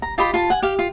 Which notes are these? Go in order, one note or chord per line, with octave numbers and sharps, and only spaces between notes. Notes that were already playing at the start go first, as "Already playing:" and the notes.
A#5
F4 G4 D#5 B5
F4 A5
F#5 G#5
G4 F5
F4